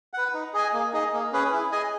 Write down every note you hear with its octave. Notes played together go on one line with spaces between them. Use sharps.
B4 F#5
D#4
G#4 D#5 G#5
A#3
D#4 G#4 D#5
A#3
C#4 G#4 B4
E4
G#4 D#5 G#5